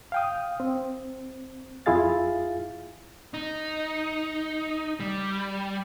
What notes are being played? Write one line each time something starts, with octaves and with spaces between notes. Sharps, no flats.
F5 G5 D#6
C4
F2 E4 F4 G#4 F5 A6
D#4
G3